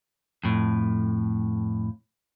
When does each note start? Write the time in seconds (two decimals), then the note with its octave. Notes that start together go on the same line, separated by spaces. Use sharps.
0.43 F2 A2